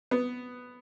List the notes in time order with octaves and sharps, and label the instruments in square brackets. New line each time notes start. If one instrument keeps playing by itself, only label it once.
[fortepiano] B3